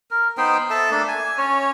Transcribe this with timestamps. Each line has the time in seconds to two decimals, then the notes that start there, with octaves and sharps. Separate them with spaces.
0.11 A#4
0.38 B3 D#4 C5 G5
0.70 A4 E5 A5
0.91 A3 A#3 D4 A4
1.08 G#5
1.38 C#4 C#5